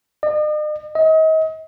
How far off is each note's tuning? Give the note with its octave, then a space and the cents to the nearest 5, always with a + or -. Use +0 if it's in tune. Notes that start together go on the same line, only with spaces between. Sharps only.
D#5 -45
D#5 +35